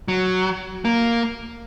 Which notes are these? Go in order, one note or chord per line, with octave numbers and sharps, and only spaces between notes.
F#3
A#3